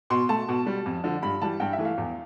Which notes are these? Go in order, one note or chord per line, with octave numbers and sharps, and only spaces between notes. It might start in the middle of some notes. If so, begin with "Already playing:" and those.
B2 C6
A3 A5
B2
G3
F2
D3 F3
G2 B5
E3 G3 A5
G2 G5
E5
E3 A3
F5
E2